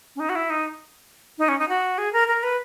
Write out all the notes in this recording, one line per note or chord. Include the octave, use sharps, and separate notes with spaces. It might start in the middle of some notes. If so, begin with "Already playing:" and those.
C#4
D#4
F#4
E4
D#4
D#4
C#4
D#4
F#4
G#4
A#4
A#4
B4